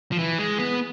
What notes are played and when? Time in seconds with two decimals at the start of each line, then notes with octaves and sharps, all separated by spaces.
0.12 F3
0.19 E3
0.39 G#3
0.59 B3